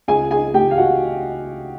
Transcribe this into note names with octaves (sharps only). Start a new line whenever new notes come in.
C#2 G#4 G#5
G#4 G#5
A3 G4 G5
F5
F#4 F#5